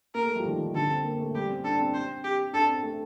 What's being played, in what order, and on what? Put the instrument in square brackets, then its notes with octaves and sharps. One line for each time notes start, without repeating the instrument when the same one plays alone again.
[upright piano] A#3 [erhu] A#4
[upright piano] A3
G3
F3
D#3
D#3
[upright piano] D3 [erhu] A4
[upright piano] C4
A#3
A3
[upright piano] G3 [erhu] G4
[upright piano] C4
[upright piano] D4 [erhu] A4
[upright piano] C4
[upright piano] C4 [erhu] C5
[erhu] G4
[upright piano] D4 [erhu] A4
[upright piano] C4
A3